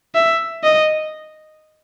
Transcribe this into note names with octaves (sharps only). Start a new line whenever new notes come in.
E5
D#5